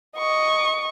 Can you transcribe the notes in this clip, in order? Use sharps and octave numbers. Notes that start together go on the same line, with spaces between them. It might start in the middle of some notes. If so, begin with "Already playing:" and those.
D#5 C#6